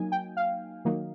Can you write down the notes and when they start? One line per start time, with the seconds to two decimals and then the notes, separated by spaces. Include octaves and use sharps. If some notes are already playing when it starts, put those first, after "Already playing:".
Already playing: F#3 A#3 D#4 G#5
0.12 G5
0.37 F5
0.85 D#3 F#3 A#3 D#4